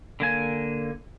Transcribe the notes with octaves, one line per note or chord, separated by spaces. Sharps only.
D3 A#3 G#5